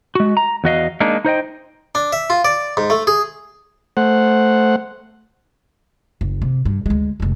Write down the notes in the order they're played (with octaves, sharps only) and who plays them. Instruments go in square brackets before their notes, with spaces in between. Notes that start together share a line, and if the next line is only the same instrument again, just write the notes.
[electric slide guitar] G#3 F#4
A#5
E2 F#4 D#5 F5
G#3 A#3 D4 D#4
D#4 C5 D#5 G5
[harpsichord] D4
E5
F4
D5
G#2
A3
G#4
[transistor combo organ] A3 C5 F#5
[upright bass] F#1
C3
G2
D2 G#3
F1 G#2